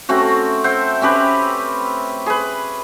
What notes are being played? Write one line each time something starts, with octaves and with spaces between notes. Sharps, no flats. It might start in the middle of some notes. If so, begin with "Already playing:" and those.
A3 C4 C#4 F#4
C5 E5 F#5 G5
C4 C#4 G4 B4
G#4 B4